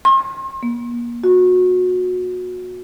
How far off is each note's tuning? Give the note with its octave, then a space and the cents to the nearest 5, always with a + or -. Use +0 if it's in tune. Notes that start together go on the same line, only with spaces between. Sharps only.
C6 +45
A#3 +35
F#4 -25